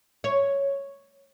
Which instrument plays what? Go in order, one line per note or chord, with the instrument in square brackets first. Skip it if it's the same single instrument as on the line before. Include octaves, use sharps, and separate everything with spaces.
[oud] C#5